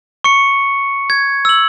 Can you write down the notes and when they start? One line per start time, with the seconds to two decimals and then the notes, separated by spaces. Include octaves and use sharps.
0.24 C#6 C#7
1.10 G#6
1.45 E6 F#7